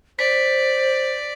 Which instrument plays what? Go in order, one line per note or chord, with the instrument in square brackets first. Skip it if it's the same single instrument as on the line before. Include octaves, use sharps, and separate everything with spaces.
[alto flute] C5 [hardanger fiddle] D5 [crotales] B6